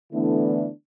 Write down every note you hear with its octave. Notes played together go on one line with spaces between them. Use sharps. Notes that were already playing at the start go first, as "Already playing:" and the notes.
D3 E3 A3 B3 D4 E4